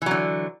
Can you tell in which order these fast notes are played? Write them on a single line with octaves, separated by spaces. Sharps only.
E3 F#3 D3